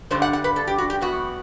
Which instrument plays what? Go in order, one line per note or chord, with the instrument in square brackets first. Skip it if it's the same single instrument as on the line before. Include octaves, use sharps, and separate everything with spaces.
[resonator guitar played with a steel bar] G2 D3 G3 C5
F#5
F#5
B4
A4
G4
F#4
G4
F#2 E3 B3 F#4